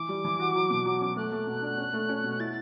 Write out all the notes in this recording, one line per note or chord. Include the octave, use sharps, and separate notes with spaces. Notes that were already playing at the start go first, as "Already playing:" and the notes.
Already playing: E3 D6
G3
E3
F#4
F#3
B2
F#3
C#4
A3 F#6
A3
B2
D4
C#4
A3
C#4
B2
E4 A6